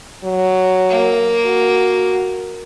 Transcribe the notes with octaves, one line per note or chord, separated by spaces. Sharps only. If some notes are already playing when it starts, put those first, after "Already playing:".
F#3
A#3
F#4